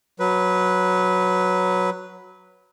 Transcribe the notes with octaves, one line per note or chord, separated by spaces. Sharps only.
F#3 B4